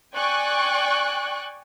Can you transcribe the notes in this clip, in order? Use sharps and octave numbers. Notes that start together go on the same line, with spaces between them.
D5 G5 G#5 C#6 F#6